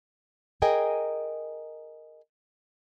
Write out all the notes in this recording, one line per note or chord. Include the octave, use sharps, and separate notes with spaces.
G#4 A#4 D#5 G5 G#5